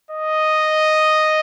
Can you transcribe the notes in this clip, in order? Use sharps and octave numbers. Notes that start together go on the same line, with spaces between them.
D#5